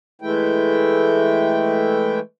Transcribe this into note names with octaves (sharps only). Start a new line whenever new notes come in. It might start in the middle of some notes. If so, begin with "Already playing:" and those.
E3 G#3 A3 E4 G5